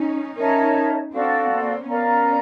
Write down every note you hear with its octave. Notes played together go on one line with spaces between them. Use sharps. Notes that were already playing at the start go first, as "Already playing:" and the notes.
Already playing: C#4 D#4
C#4 D#4 A#4 C#5 E5 A5
C4 D4 F#4 A4 D5 F5
A#3 C4
B3 C#4 A#4 D5 F5 A#5